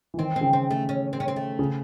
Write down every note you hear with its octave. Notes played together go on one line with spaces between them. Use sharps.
E3
D#3 C4
C4
C#3
C4
A3
C#4
C4
C#4
C4
A3
C#3